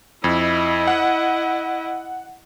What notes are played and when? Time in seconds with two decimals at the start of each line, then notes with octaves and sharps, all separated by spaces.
0.24 F2 E4 D#5
0.87 F#5